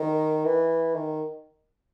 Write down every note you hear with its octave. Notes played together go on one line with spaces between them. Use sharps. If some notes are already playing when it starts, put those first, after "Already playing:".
Already playing: D#3
E3
D#3